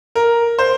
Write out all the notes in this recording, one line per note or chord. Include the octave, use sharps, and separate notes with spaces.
A#4
C5